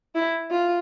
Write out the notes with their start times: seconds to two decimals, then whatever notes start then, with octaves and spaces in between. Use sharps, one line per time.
0.15 E4
0.51 F4